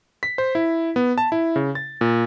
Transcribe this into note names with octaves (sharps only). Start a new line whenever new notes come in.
B6
C5
E4
B3
A5
E4
C#3
A6
A#2